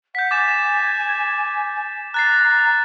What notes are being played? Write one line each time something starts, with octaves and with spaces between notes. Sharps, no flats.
F#5 G6 B6
G#5 D6 A6 E7
A#5 F#6 A6 C7